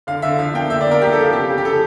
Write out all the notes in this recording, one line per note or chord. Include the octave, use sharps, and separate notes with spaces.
D3 F5
D3 E5
F3 F5
A#3 G5
D3 E5
D5
A#3
A#4
F3 G4
A4
F3 F5
C#3 G4
C#3
G4
F3 A4